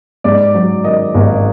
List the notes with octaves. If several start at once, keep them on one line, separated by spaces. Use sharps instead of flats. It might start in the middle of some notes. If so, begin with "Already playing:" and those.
G#2 D5
F#3
D#3 D#5
G#1